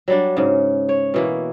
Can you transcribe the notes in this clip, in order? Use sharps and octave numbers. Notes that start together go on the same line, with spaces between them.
F#3 G3 D4
G#2 C#3
C#5
B2 E3 A#3